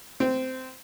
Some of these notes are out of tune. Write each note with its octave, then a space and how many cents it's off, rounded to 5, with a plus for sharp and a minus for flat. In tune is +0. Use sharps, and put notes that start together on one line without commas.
C4 -15